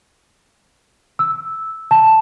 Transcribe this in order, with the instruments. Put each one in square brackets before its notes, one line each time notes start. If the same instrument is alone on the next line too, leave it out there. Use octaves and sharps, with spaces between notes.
[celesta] E6
A5